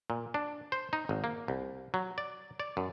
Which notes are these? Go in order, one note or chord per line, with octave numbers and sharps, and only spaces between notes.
A#2
D4
C5
D#4
G#1
A#3
C2
F#3
D5
D5
F#2